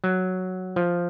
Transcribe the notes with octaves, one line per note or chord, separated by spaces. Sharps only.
F#3
F3